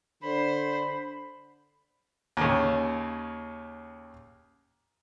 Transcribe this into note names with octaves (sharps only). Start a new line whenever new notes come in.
D3 C5 B5
D#2 C#3